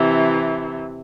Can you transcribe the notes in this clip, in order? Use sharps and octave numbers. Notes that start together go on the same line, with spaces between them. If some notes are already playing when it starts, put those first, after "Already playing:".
Already playing: C3 E3